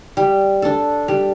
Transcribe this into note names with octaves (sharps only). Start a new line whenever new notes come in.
G3
D4 A4
G3